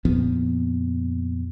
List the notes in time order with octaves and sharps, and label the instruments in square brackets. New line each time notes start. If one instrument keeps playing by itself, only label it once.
[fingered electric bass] F2 A#2 F3 B3